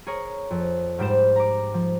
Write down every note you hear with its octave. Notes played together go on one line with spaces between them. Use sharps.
G#4 A#4 C#5
F2
G#2 G3 G4 B4 C5 E7
A#5 D6
F3